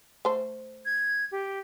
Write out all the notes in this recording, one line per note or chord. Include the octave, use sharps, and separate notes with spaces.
A3 C5
G#6
G4